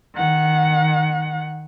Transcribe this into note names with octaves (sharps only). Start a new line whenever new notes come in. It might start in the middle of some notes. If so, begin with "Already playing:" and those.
D#3 F#5